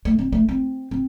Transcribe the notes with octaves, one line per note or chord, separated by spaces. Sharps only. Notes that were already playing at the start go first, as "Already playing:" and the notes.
A3
C4
A3
C4
C4